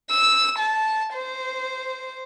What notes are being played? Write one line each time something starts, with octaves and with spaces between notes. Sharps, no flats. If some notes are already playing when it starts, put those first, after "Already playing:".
E6
A5
C5